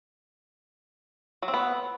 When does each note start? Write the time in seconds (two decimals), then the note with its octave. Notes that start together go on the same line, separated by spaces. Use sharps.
1.42 F#3
1.48 C4
1.54 B3